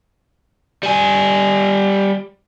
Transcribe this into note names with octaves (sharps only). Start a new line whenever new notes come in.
G3 G#5